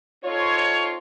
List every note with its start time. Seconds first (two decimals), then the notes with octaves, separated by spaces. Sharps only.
0.25 C4 D#4 F4 A4 C#5